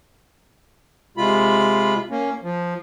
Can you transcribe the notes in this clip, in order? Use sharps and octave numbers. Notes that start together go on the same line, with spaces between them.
C3 G#3 F4 B5
A#3 C#4
F3